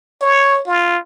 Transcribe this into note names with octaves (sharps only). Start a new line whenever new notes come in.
C#5
F4